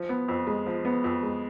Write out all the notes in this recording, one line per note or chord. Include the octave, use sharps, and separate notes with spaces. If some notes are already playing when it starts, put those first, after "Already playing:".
Already playing: F3
B3
F2
G#3
F3
B3
F2
G#3